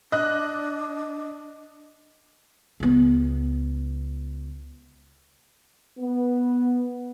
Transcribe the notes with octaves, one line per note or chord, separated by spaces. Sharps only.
D4 D#5 F#6
C#2 B3
B3